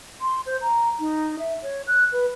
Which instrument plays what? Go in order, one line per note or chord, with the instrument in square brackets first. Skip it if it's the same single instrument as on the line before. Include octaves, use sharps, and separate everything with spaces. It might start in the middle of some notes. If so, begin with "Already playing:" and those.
[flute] C6
C5
A#5
D#4
E5
C#5
F#6
B4